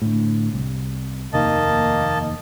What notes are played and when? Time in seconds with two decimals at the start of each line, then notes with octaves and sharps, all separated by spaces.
0.02 A2 D3
0.53 C2
1.33 F1 D#2 D#3 A#3 D#5 A5